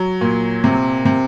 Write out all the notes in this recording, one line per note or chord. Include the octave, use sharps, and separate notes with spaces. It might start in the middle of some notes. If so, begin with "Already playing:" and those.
Already playing: F#3
A#2
C3
C3